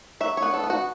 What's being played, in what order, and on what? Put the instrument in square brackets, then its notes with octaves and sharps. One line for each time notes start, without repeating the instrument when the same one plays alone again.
[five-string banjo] F#3 E5
C#5
B3
A4
B3
F#4